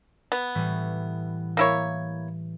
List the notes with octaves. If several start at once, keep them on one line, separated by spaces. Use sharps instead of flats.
B3
A2 E3 G3
A#3 E4 C#5